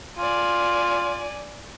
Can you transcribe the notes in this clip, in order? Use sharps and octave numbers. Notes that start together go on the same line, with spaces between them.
F4 D5 G#5